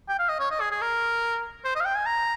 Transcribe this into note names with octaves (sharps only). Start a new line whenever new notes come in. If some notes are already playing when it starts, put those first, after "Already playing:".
G5
F5
D#5
C#5
D#5
G#4
G#4
A#4
C5
D#5
F5
G5
G#5
A#5